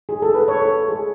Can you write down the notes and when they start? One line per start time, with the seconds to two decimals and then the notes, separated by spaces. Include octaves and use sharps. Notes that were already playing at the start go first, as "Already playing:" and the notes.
0.09 G#4
0.22 A4
0.35 B4
0.48 C#5
0.62 A4
0.88 G#4